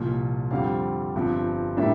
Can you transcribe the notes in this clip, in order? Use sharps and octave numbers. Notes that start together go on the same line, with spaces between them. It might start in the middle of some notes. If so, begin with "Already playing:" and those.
Already playing: C2 A#2 F3
F2 D3 G3 C4 F5
G1 G2 F3 C4
A2 G3 A#3 D4 E5